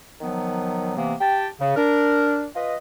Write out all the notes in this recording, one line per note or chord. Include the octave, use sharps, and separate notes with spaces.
D#3 F3 F#3 B3
C3 E3 A#3 B3
G4 G5 A5
C#3
D4 A#4
F4 B4 D#5